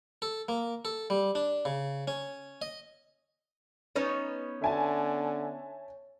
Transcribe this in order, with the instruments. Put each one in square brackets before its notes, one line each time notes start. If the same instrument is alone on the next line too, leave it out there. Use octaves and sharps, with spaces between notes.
[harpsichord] A4
A#3
A4
G3
D4
C#3
C#4
D#5
[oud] B3 C#4 D#4 [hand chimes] C#5
[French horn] D3 [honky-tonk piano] E5 G#5 A5